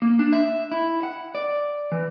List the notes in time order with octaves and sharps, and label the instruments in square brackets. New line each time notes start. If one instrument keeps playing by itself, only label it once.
[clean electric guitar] A#3
D4
E5
E4
F#5
D5
E3